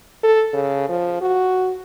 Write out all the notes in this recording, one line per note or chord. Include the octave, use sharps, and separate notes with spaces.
A4
C#3
F3
F#4